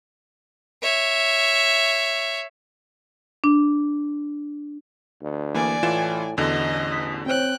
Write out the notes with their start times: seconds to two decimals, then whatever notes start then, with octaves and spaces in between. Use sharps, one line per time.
0.83 C#5 E5
3.44 D4
5.22 D2
5.55 E3 A#3 D5 G#5
5.83 A2 E3 F4 E7
6.38 A1 E2 D3 F#4 D#5
6.91 D#6 B6
7.26 C4 C5 C#5 G5 F#6